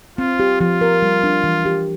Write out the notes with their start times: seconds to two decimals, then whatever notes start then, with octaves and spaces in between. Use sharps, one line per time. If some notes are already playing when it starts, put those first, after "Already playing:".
0.18 C4 F4
0.40 G4
0.61 F3 F4
0.81 A#4
1.02 G3
1.24 D4
1.44 E3
1.65 G4